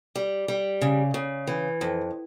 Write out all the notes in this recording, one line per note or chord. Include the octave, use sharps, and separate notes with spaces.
G3
G3
C#3
C#3
E3
F2